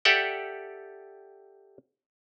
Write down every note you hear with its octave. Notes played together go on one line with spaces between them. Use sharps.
G4 A4 D5 E5 F#5 G5